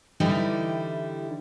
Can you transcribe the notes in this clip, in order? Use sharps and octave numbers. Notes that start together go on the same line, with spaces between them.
D3 E3 G3 D#4 E4 G4